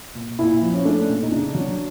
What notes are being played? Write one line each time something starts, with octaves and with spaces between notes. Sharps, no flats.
A#2
A#2 E4
F3
C#4
A3 D4
A#2
D#4
C#3 D4
F#3